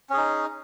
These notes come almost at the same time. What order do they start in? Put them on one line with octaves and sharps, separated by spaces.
C#4 G#4 D#4